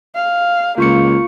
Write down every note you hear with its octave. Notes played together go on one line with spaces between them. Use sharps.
F5
C#2 A#3 F4 C#6 C#7